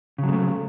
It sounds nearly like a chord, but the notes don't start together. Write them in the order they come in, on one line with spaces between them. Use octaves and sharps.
C#3 F#3 G#3 A3